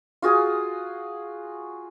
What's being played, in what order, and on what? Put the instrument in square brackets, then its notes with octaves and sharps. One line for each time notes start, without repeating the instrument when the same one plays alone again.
[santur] F4 F#4 G#4 G#5